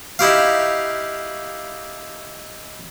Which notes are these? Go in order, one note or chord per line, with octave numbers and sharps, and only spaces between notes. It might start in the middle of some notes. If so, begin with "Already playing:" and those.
D#4 E4 G4 F5